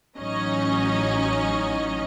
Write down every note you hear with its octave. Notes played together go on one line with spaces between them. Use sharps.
A1 F#3 C#4 D#4 D#5